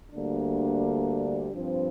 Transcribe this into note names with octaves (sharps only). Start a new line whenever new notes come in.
D2 D3 G3 A#3 D4
G2 F3 C4